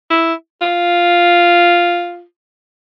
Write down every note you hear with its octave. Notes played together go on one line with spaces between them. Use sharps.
E4
F4